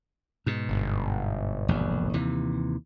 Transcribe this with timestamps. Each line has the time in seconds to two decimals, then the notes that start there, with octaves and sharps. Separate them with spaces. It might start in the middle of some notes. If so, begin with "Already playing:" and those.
0.46 G#2 B2
0.69 G1
1.68 E1 A#1 D#2
2.14 D#2 C3 E3